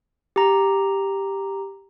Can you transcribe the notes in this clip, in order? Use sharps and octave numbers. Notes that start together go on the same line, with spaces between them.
G4 A#5